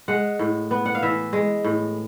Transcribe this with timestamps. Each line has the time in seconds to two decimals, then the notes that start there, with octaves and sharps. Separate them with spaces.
0.08 G#3 F#5
0.39 A2
0.71 B3
0.86 F#5
0.95 F5
1.02 E3 E5
1.33 G#3
1.64 A2